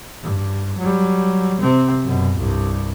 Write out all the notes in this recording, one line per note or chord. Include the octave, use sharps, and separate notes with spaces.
G2
F#3 G3
C3 C4
F#2 B2
C2 G2